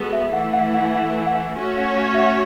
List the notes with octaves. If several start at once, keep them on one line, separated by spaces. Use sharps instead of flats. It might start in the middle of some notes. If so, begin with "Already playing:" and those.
Already playing: G#3 B3 F#4 A4
E5
E3 A3 E4 F#5
F#5
F#5
G#5
F#5
G#5
F#5
G#5
A3 C#4 F#4 C#5 G#5
F#5
G#5
E5
F#5